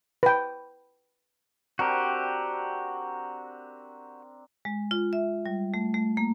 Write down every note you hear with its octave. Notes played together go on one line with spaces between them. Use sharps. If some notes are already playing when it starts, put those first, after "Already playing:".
B4 G5
C4 D4 F#4 G4 A#4
G#3
F4
E5
G3
A3
A3
A#3